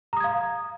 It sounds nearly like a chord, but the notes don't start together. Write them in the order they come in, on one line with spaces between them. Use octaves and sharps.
A#5 D#6 G#6 F5